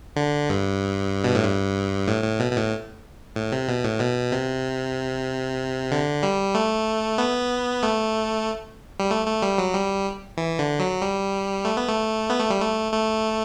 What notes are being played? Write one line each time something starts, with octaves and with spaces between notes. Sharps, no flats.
D3
G2
B2
A2
G2
A2
A2
B2
B2
A2
A2
C3
B2
A2
B2
C3
D3
G3
A3
B3
A3
G3
A3
A3
G3
F#3
G3
E3
D3
F#3
G3
A3
B3
A3
B3
A3
G3
A3
A3